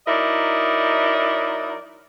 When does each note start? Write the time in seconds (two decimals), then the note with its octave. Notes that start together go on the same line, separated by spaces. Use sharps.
0.07 F#3 D#4 E4 A#4 D5 D#5